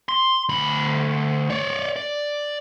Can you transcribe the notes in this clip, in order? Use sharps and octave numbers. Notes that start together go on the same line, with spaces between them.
C6
D2 B5
C#5 D5
D5